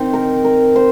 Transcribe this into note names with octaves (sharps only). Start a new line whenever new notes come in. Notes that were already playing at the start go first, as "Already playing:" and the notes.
Already playing: D#3 C4
A#4
A#4
C5